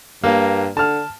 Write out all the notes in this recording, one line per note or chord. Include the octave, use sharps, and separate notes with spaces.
G2 A#3
D3 A5 F6